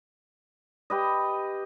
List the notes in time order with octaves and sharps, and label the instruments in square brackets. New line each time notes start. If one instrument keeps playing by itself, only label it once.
[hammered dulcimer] G4 B4 D#5